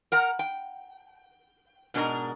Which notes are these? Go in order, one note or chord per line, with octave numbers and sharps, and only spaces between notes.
A#4 F#5 A#5
G5
G#2 B2 D4 A#4 D#5 A#5